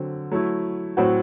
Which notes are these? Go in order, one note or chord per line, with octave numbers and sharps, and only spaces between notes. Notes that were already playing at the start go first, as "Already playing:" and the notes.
Already playing: D3 F#3 C4
F#3 A3 E4
A2 F#3 C4 F#4